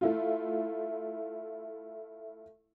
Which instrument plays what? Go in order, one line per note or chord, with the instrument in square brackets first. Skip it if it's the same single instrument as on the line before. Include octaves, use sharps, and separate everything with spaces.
[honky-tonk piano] A3 E4 F4